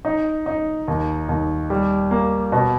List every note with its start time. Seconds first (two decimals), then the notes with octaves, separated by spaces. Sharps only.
0.05 D#4
0.46 D#4
0.88 D#2
1.29 D#2
1.70 G3
2.11 A#3
2.52 B2